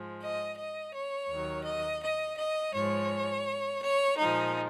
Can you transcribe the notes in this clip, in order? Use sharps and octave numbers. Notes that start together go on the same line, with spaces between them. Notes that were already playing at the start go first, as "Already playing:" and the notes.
Already playing: G#2 F3 G#3
D#5
D#5
C#5
D#2 D#3 F#3
D#5
D#5
D#5
G#2 F3 G#3 C#5
C#5
A#2 F3 G#3 D#4